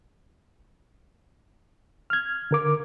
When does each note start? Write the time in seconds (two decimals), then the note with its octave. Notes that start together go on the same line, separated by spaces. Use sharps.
2.10 F6 G#6
2.51 D3 A#4 D6